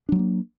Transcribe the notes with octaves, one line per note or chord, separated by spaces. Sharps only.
F#3 G#3 A#3 D4